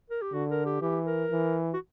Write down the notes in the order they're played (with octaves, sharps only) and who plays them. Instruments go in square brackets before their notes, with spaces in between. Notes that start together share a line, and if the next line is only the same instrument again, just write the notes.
[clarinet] A#4
G4
[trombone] D3 [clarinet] F#4
[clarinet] A#4
G4
[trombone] E3 [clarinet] G4
[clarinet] A#4
[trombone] E3
[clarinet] F#4